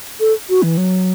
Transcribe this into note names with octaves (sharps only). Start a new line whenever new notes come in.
A4
F#4
E3
F#3